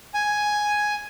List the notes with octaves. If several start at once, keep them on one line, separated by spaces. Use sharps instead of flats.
G#5